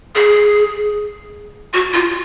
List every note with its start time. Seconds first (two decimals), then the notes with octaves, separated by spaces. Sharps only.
0.15 G#4
1.74 F#4
1.93 F4